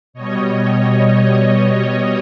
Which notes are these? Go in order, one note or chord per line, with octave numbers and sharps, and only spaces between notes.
B2 G3 C#5 D#5
C#5 D#5